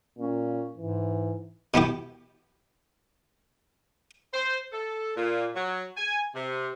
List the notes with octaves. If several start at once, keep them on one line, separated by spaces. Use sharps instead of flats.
A#2 C#4
G#2 E3
B2 B3 E4 G4
C5
A4
A#2
F#3
G#5
C3